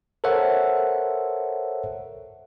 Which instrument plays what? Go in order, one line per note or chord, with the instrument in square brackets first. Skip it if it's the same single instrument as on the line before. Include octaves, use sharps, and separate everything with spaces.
[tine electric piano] A4 A#4 C5 C#5 E5 F#5